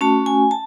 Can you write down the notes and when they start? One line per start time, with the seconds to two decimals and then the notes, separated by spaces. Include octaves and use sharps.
0.01 A3 C#4 F#4 A5
0.26 G#5
0.51 A5